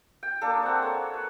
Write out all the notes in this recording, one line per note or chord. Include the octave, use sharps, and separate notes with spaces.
G5
A#3 D4 G#4 A4
C4 F#5
C#5
B4